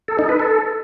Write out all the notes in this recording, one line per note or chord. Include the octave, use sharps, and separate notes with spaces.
A4
D#4
B4
A4